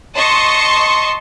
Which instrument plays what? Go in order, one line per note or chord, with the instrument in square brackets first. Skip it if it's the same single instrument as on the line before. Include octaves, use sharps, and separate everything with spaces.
[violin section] D#5 A5 C6 C#6